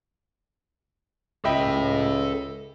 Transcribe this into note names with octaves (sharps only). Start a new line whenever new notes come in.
C#2 A4 D#5 E5 G5 B5